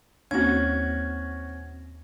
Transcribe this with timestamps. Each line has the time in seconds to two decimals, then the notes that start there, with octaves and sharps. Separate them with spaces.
0.31 D#2 A#3 C4 C#4 F#4 G#6